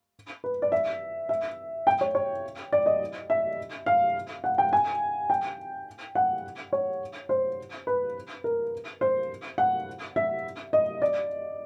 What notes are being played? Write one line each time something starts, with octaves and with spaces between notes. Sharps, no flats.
B4
D5
E5
E5
G5
C#5
C#5
D5
D#5
E5
F5
F#5
G5
G#5
G5
F#5
C#5
C5
B4
A#4
C5
F#5
E5
D#5
D5